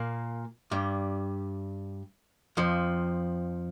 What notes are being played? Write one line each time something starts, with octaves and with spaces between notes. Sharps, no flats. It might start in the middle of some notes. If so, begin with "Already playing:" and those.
Already playing: A#2 A#3
G2 G3
F2 F3